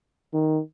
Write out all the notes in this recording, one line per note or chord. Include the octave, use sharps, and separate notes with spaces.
D#3